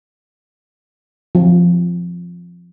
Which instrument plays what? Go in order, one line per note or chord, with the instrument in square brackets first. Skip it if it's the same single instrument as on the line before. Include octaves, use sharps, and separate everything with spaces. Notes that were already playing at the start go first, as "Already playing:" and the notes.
[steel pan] F3